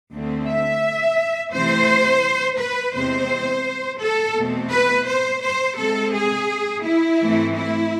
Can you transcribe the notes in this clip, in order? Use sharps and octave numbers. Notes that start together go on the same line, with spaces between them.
D2 D3 A3 C4
E5
C3 E3 A3 C4 C5
B4
E2 C3 G#3 C4 C5
A4
E2 B2 A3 C4
B4
C5
C5
C3 G#3 C4 A4
G#4
E4
G#2 E3 A3 C4
E4